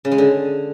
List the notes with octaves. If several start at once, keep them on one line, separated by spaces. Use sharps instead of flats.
C#3
G#3
D3